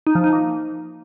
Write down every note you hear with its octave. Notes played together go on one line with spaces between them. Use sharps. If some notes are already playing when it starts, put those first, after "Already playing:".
D#4
F3
D#4
A#3